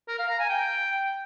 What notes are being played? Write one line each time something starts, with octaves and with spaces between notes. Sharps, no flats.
A#4
F5
A#5
G#5
G5